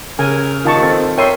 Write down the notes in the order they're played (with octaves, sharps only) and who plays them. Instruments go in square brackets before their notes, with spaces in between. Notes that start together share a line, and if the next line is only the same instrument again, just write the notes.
[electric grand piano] C#3 [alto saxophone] A#4 [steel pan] G#5
[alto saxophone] D#3 [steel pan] F4 A5 C#6
[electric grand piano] C4 A4 A6
[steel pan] A#4 E5 C6 [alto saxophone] C#5 [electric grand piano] G5 D#7